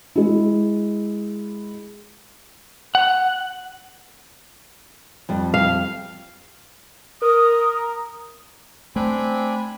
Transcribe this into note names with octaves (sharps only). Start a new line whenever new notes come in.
G#3 E4
F#5
F2 G3
F5
A#4 D#6
A3 C4 D4 G#5 B5